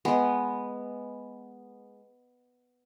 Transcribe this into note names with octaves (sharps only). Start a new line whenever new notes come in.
G#3 B3